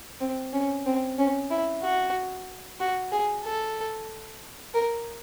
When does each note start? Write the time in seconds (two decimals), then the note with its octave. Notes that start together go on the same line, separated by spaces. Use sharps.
0.21 C4
0.53 C#4
0.86 C4
1.18 C#4
1.51 E4
1.82 F#4
2.80 F#4
3.12 G#4
3.44 A4
4.74 A#4